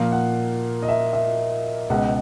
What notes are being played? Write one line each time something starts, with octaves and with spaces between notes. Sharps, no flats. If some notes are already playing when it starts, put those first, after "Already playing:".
Already playing: A#2 F3 A#3 F5
F#5
D#5
E5
E5
C#2 B2 G#3 F#5